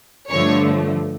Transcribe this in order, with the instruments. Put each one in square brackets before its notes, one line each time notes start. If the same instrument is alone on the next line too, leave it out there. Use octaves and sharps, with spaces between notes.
[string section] G2 D3 F3 A3 C#5